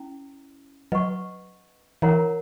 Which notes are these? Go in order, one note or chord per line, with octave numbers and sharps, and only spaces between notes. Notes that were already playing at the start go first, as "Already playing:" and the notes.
Already playing: C#4 E4
F#3 B4 D#5 F#5 C#6
E3 E4 A#4 C#5 F#5 A#5